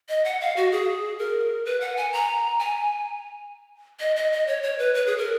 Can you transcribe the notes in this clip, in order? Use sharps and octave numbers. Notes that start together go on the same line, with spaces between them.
D#5
F#5
F5
F#4
G#4
A#4
B4
F#5
G#5
A#5
G#5
D#5
D#5
D#5
C#5
C#5
B4
B4
G#4
A#4